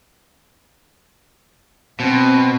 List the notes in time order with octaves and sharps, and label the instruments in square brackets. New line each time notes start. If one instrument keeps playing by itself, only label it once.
[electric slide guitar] B2 [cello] C4